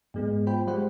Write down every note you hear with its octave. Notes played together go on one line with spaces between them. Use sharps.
G#2 G#3 B3
F4 C5 G5 B5
G3 G#3 C5 F#5